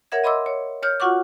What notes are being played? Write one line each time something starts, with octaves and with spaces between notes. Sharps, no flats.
A#4 C#5 E5 F#5 G#6
D#5 B5 C6 D6 E6
C#5
C#5 F6 G6
F4 F#4 F#5 C#6 D6